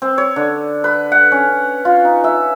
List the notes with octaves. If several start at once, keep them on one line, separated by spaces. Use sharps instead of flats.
C4
C#5
D3
B4
F#5
C#4
F4
D#4
E5